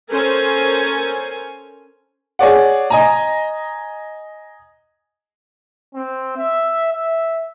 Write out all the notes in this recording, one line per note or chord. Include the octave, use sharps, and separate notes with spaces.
C#4 A4 A#4 C5 G#5
G#4 C#5 D5 F#5
D#5 G#5 A#5
C4
E5
E5